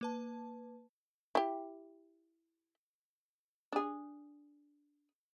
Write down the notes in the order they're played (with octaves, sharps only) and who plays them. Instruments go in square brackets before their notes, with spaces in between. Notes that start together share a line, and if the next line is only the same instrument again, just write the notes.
[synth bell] A#3 B4 A5
[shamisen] E4 G4
D4 G#4